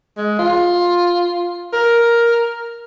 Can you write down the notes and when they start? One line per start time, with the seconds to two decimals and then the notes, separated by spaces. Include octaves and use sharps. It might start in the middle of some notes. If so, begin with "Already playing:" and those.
0.18 G#3
0.39 F4
1.73 A#4